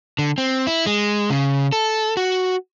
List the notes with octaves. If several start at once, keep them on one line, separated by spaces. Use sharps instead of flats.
D3
C4
E4
G#3
C#3
A4
F#4